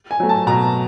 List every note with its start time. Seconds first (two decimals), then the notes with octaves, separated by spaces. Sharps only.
0.11 G#5
0.20 F#3 A3
0.29 A5
0.47 B2 A#5